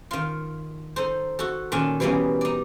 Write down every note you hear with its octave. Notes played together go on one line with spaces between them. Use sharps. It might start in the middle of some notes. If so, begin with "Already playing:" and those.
D#3 F4
D#4 A4 C5
F#4 A4
A#2 D#3 C#4 A4 G#5 A5
B2 E3 G3 A#3 B3 C#4
D#4 D5